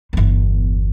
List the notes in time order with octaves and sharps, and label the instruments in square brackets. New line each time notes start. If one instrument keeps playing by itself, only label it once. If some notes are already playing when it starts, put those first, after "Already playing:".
[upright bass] G1 E2